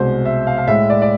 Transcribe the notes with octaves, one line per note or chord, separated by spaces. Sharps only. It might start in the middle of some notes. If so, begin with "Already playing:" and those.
Already playing: C2 B2 G#3 C5
E5
F5
F5
A2 G#3 E5
D5
D5